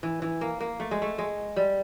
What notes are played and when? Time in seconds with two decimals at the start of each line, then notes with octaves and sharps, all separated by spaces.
0.03 E3
0.22 E3
0.41 A#3
0.61 A#3
0.80 A3
0.91 G#3
1.02 A3
1.18 G#3
1.56 G3